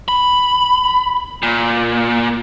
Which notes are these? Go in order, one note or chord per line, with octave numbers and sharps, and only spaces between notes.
B5
A#2